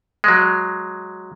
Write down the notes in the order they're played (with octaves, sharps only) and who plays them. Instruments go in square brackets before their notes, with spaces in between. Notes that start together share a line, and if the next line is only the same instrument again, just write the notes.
[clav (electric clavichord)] F#3 G#3